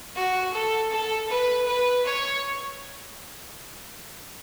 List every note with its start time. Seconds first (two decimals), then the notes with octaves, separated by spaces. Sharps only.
0.16 F#4
0.54 A4
0.91 A4
1.29 B4
1.67 B4
2.05 C#5